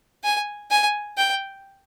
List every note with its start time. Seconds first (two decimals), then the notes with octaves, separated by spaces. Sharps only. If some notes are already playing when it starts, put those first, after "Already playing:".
0.24 G#5
0.71 G#5
1.17 G5